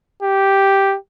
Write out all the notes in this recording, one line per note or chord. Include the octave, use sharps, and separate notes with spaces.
G4